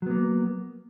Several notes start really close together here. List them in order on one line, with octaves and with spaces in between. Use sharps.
F#3 B3 A#3